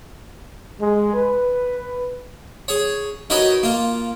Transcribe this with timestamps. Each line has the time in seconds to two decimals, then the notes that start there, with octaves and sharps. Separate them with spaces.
0.79 G#3
1.13 B4
2.68 G#4 C#5
3.30 D#4 F#4 A#4 B4 C#5 D#5
3.63 A#3 F4